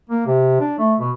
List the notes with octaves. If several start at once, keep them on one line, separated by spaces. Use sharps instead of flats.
A#3
C3
D4
A3
B2